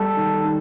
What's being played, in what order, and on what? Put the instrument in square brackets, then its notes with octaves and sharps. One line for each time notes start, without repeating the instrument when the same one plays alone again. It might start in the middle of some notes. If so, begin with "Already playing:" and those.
Already playing: [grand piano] G3 [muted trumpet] A4
[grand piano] D#3
D#3